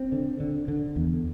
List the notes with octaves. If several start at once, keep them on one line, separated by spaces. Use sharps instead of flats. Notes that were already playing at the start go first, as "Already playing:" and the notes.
Already playing: C4
D3
D3
D3
E2